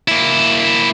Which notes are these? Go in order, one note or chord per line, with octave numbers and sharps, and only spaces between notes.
A#3 E4